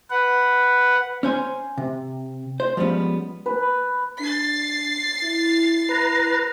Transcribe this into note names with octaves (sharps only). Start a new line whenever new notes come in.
B4 F#5
C#4 C5 G#5
C3
C5
F3 G3 G#3 B3 C#4
B4
D4 A6 C7
E4
B4 A#5